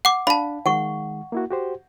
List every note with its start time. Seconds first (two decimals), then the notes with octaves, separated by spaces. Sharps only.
0.05 F#5 D6
0.27 D4 F5 A5 B5
0.66 D#3 G#3 F#5 C#6
1.32 A#3 E4 F#4
1.50 F#4 G4 C5